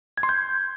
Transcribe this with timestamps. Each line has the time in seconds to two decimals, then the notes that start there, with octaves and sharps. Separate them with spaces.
0.17 G#6
0.23 C6
0.29 G6